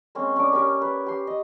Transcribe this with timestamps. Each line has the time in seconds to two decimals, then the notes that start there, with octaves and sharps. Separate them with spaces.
0.15 G#3 A#3 C4 C#4
0.36 C#4 D4 D6
0.52 C#4 G4 A#4
0.82 B4
1.06 G4 C6
1.27 D#5